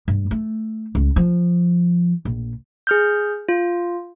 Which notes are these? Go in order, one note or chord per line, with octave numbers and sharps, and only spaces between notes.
G2
A3
C#2
F3
A#1
G#4 F6 G6
F4